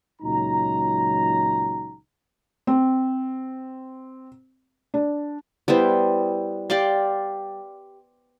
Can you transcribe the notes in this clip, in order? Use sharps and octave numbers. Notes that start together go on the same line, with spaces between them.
C#2 A#2 F#3 D#4 A#5
C4
D4
G3 B3 E4 C5
G4 D5 F5 C6